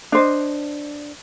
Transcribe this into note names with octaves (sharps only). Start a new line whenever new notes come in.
D4 C5 D#5